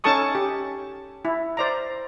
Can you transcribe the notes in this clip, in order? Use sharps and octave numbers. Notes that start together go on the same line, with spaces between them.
C#4 D#4 A4 A5 C#6 D#6
G4
E4
C5 D5 A#5